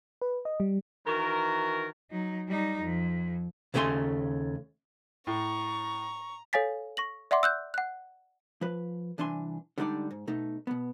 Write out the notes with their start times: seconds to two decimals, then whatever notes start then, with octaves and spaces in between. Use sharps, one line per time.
0.22 B4
0.45 D#5
0.60 G3
1.06 D#3 E3 F#4 A#4
2.11 F#3 D#4
2.48 G3 D#4
2.82 F2
3.74 D#2 C#3 A3 G5 G#5 C6
5.27 A2 A#5 C#6
6.53 A4 C#5 F5 G#5 A6 B6
6.97 C#6 A#6 F#7
7.31 D5 E5 F#5 C6 D6
7.43 E6 F#6 G6
7.74 F#5 F#6
8.61 F3 B4
9.18 C2 E3 D4 G#5 C6
9.78 D3 G3 G#3 D#4 D5 A5
10.11 G#2
10.27 B2 A3 D#4
10.67 B2 B3